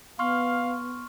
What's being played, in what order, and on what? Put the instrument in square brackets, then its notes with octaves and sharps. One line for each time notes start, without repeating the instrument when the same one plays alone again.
[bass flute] B3 [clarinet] F5 [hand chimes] C6 C#6 F6